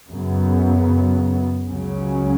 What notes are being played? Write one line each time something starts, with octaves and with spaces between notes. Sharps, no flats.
F#2 C#3 F#3 B3
C#2 C#3 F#3 C#4